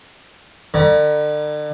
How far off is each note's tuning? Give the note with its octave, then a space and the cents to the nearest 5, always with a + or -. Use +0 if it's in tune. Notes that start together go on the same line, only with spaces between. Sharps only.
D3 +40 A#5 +40